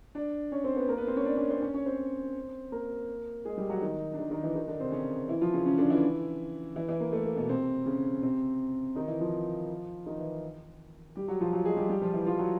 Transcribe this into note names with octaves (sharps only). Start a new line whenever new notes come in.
D4 D5
C#4 C#5
C4 C5
B3 B4
A#3 A#4
B3 B4
C4 C5
C#4 C#5
D4 D5
C#4 C#5
C4 C5
C#4 C#5
C#4 C#5
C4 C5
A#3 A#4
G#3 G#4
G3 G4
F#3 F#4
D#3 D#4
D4
D#3 D#4
D#3 D#4
E3 E4
D#3 D#4
D3 D4
C3 C4
C#3 C#4
E3 E4
F3 F4
C#3 C#4
C#3 C#4
D3 D4
E3 E4
E3 E4
E3 E4
A#3
A3
A#3
B2 B3
C3 C4
C#3 C#4
C3 C4
D#3 D#4
E3 E4
F3 F4
D#3 D#4
E3 E4
G3 G4
F#3 F#4
F3 F4
F#3 F#4
G#3 G#4
G3 G4
G3 G4
F3 F4
E3 E4
F3 F4
F#3 F#4